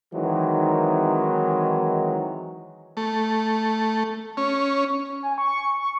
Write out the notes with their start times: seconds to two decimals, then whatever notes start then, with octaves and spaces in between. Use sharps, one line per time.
0.13 D#3 E3 F#3 G#3 C4
2.97 A3
4.37 C#4
5.23 G#5
5.38 C#6
5.76 C#6